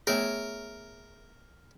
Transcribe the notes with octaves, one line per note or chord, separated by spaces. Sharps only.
A3 B3 G#4 A#4 C#5 E5